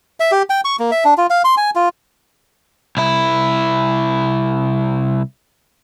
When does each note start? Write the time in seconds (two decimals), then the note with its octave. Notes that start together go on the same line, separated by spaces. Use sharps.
0.20 E5
0.32 G4
0.50 G5
0.65 C#6
0.79 A#3
0.91 E5
1.05 D4
1.18 F4
1.30 F5
1.44 C6
1.57 G#5
1.75 F4
2.97 C2 E4